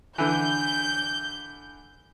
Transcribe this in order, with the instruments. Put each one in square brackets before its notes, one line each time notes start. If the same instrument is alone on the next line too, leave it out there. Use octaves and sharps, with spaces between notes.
[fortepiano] D3 E3 [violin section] G6